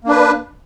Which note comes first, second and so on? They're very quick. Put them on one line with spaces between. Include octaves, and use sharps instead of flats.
A#3 D4 B4